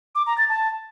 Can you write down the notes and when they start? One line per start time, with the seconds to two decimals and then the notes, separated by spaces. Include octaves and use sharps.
0.15 D6
0.27 A#5
0.38 A6
0.49 A5